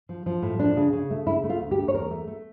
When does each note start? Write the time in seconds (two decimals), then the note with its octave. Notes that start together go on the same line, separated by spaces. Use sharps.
0.09 F3
0.26 F3
0.42 A2
0.59 F3 D4
0.76 C#3
0.93 C#3
1.10 A3
1.26 C#3 E4
1.44 A3
1.49 F4
1.60 D2
1.71 G4
1.78 A3
1.88 C#5
1.94 E2 A#4
2.11 A3
2.27 A3